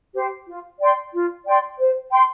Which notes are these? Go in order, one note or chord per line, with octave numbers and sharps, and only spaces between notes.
G4 C5
F4
D5 G5 C6
F4
D5 G5 C6
C5
G5 C6